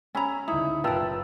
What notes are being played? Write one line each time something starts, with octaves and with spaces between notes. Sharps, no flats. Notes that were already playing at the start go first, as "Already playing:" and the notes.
C#4 G#5 A#5 B5 E6
C#2 D3 D#4 E4
F#1 B2 F4 A#4 B4 G5 A5 E6